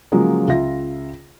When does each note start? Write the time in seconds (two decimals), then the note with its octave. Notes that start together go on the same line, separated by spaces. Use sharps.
0.12 C#3 F3 F#3 G#3 A#3
0.48 C#2 F4 E5 A#6